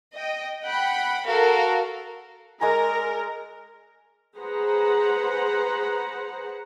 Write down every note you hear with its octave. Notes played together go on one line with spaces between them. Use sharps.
D#5 G5
F#5 G5 B5
F#4 A4 A#4 F5
G#3 A#4 D5 G#5 A#5
G#4 B4 C5 F#5 A#5